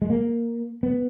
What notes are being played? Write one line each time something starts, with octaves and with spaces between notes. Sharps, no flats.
G#3
A#3
B3